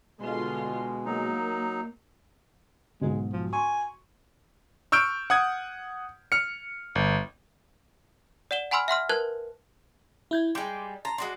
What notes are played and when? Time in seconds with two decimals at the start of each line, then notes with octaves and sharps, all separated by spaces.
0.21 B2 D3 G#3 F4 C6
1.05 F#3 A#3 D#4
3.01 B1 G#2 G#3
3.33 F3
3.53 G#5 C6 C#6
4.92 C#6 E6 F6 G6 D7
5.30 F#5 D#6 G#6
6.32 F6 C#7
6.95 G1
8.51 D5 F#5 E7 G7
8.71 F#5 G#5 B5 C6 E6 F6
8.88 E5 F#5 C6 F6
9.09 A#4 B4 A5 F#6 G#6
10.31 E4 G6 G#6
10.55 G3 G#3 C6 D6 G6
11.05 A5 A#5 C6
11.18 G#3 F#4 D5 C6